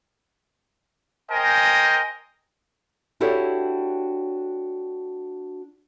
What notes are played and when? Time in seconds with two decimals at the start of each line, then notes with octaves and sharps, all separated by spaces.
1.30 A#4 C5 D#5 G5 G#5
3.20 D4 E4 F#4 G4 A4 C#5